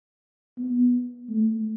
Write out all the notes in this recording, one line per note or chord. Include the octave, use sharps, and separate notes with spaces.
B3
A3